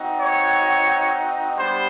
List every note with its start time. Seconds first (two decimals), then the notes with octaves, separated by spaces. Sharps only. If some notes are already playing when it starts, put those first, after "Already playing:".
Already playing: C4 D#4 F#4
0.18 C#5
1.57 G3 B3 D4 G4 C5